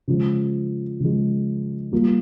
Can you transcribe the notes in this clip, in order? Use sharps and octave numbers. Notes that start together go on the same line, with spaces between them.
C#3 F3 G#3
C#3 F3 G#3
G3 A#3 F4